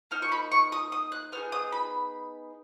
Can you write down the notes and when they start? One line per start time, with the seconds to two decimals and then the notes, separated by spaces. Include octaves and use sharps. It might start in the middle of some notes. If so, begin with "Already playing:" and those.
0.11 A#3 D#4 F6
0.22 C#6
0.32 B5
0.52 C#6
0.72 D#6
0.92 D#6
1.12 F#6
1.32 B3 D#4 G#4 F6
1.52 D#6
1.72 B5